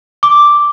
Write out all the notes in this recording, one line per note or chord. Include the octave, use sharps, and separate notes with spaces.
D6